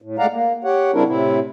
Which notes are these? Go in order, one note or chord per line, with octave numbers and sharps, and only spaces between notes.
A2
G#3 A3 D5 F5 F#5 A#5
A#3
G4 C#5 F#5
C#3 G3 C4 D4 E4 A#4
A2 C3 C4 E4